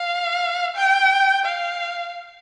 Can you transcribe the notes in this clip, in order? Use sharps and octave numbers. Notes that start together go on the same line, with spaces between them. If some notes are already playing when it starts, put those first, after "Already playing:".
Already playing: F5
G5
F5